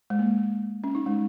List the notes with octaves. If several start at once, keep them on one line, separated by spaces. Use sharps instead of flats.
G#3
A#3
C#4
D#4
G#3